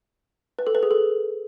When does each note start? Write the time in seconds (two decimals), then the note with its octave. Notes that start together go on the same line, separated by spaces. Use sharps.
0.59 B4
0.67 A4
0.75 B4
0.83 G#4
0.91 A4